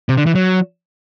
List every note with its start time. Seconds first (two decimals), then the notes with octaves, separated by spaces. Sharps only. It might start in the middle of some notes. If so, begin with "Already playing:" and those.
0.09 C3
0.17 D3
0.26 E3
0.35 F#3